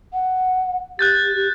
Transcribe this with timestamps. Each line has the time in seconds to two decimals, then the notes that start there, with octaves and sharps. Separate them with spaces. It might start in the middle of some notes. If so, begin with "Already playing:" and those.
0.13 F#5
0.99 G4 F#6 G6 A6